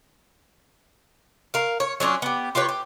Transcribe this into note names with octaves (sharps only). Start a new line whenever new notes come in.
A#4 F5
C#5
F#3 C#4 D4 F4
B3 G4
F4 G4 B4 C#5
G4